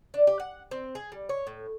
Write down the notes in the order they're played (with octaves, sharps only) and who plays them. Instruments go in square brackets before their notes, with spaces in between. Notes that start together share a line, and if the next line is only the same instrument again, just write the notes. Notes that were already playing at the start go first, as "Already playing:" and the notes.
[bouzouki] D4
G4
F#5
C4
G#4
G3
C#5
A2